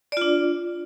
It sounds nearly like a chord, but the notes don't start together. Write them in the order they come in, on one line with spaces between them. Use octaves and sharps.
D5 F4 D4